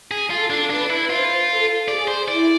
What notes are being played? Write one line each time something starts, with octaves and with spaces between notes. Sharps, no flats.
G#4
F4 A4
D4
D4 B4
E4
F4 C5
A4
G#4 D5
C5
E4 D5